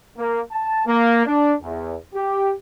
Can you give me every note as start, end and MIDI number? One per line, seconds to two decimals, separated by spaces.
0.17 0.40 58
0.52 0.86 81
0.86 1.23 58
1.26 1.54 62
1.62 1.96 40
2.14 2.53 67